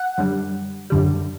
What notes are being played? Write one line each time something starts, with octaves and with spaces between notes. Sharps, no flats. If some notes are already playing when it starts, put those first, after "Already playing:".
Already playing: F#5
F#2 D3 G3
F#2 D3 G3